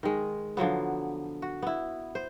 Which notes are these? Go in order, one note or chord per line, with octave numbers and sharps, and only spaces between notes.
D#3 G#3
D3 F3 F#3 B3
F#4
B3 E4
C5